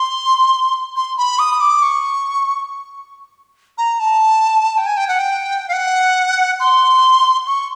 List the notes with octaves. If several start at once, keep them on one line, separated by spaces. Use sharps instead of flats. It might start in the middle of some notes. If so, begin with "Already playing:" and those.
Already playing: C6
C6
B5
D#6
D6
C#6
A#5
A5
G5
G#5
G5
F#5
G5
F5
F#5
C6
C#6